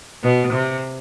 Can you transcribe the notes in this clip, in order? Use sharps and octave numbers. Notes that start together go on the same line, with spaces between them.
B2
C3